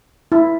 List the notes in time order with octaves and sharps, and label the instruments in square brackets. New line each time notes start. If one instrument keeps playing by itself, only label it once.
[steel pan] E4